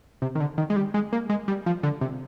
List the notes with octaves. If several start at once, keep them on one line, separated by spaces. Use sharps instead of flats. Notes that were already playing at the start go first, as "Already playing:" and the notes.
C3
D#3
D3
D#3
G#3
G3
G#3
A#3
G#3
G3
F3
D3
C3